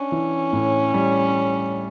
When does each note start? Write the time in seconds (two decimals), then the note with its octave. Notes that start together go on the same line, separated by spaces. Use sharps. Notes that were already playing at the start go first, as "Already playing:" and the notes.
Already playing: C#4 D4
0.12 E3
0.53 A2
0.94 G3